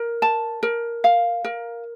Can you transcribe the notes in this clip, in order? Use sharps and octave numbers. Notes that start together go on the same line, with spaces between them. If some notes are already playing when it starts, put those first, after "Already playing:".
Already playing: A#4
A5
A#4
F5
A#4